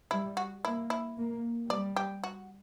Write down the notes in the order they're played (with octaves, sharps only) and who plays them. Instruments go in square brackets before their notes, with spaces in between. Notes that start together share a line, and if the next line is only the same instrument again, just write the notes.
[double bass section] G3 [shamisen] E4
[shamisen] F#4
[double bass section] A#3 [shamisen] E4
[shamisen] E4
[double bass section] A#3
[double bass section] G3 [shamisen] D5
[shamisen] G4
F#4